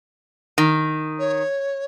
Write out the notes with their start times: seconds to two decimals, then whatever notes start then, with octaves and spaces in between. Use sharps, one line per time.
0.58 D#3
1.19 C#5